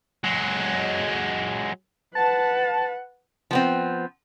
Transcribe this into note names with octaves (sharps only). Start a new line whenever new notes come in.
F#3 G#3
B4 F#5 A5
F3 B3 C4